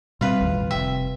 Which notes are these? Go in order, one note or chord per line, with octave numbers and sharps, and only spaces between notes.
B2 G3 C4 F4 B4
A1 E2 D#3
F1 C3 E5 G5